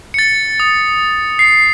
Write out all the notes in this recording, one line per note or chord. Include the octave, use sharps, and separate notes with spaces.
A6 C#7
D#6
C7